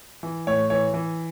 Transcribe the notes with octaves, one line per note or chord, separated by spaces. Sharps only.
E3
A2 C#5
E3 C#5
E3